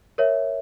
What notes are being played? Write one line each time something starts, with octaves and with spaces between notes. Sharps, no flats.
A#4 C#5 E5